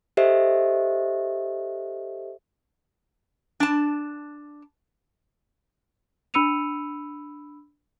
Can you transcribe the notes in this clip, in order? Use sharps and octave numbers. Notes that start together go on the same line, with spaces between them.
G4 A4 C5 D#5 E5
D4 A5
D4 B5 E6 C#7 D#7 F7